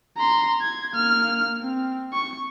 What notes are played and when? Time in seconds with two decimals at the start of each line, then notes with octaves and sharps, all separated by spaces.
0.17 A#5 C6
0.62 G#6
0.94 A#3 F6
1.61 C4
2.13 C#6